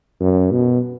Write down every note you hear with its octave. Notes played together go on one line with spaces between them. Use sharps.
F#2
B2